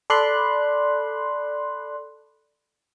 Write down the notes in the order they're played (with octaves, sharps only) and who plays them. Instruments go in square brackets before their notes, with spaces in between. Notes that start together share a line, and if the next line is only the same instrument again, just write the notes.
[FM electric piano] A4 D5 B5 C6 F#6